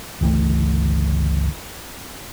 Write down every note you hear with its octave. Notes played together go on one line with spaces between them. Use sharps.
G1 C#2 E3 A3